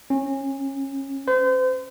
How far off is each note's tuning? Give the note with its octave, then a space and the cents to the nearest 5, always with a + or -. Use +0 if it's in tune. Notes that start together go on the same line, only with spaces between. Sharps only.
C#4 -25
C5 -35